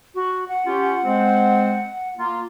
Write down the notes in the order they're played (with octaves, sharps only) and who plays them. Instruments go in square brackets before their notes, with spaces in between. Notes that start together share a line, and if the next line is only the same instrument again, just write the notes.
[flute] F#4
F#5
[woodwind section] C#4 F4 G4
G#3 C4 C5
A#3 F4